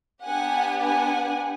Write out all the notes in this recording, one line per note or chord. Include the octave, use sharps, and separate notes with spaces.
B3 D4 G4 F#5 G#5
F#5 G#5